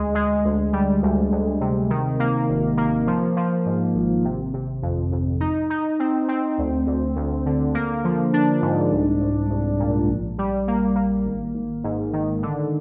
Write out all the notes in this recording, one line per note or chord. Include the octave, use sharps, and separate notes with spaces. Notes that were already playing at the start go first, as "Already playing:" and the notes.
Already playing: D2 G#3
G#3
D2
G3
D2
D2
C3
D#3
A#3
G#1
A#3
F3
F3
G#2
G#1
C3
C3
F2
F2
D#4
D#4
C4
C4
D2
D2
D2
D3
A#3
F3
D4
G#2
C2
C2
C2
A#2
A#1
G3
A#3
A#3
G#1
G#1
G#2
D#3
D3